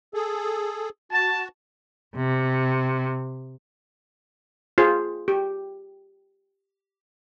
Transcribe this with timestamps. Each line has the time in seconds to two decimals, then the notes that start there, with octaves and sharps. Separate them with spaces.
0.14 G#4 A4
1.11 F#4 A5
2.16 C3
4.78 F4 G#4 C5
5.28 G4